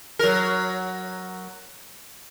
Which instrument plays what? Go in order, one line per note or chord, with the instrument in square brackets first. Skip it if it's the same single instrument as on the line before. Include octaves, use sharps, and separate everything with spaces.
[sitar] F#3 A#4